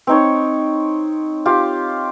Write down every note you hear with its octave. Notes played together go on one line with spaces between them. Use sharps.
C4 D#4 C#5
F4 G4